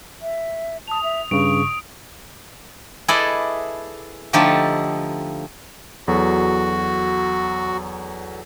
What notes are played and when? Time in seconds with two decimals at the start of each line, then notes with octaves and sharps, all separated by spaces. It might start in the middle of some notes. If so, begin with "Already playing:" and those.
0.22 E5
0.88 A5 D#6 F7
1.04 E5
1.31 G2 C#3 C#6 D7
3.08 E4 G#4 A4 B4 D5 D#5
4.33 D3 F3 A3 D#4 G4 A4
6.08 E2 F#3 F#4 A4